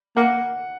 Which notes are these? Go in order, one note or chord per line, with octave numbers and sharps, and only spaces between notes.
A#3 F#5